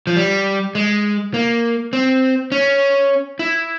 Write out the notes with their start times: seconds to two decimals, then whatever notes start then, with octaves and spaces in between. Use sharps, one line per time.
0.07 F3
0.16 G3
0.75 G#3
1.34 A#3
1.93 C4
2.52 C#4
3.39 E4